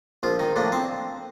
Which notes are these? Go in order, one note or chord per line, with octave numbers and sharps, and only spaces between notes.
A#1 F3 F4
D#3 D#4
A2 F3 A#3 D4
C4 C5